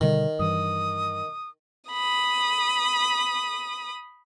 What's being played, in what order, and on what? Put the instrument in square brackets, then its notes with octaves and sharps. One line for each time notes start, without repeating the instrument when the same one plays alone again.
[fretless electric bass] B2 D3 G3 [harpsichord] D#3
[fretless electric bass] G2 E3 [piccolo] D#6
[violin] B5 D#6